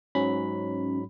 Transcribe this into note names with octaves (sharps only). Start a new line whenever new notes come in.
G#2 F#3 C#4 B5